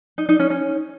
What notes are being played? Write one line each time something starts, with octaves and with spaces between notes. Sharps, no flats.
D#4
D#4
C#4
C#4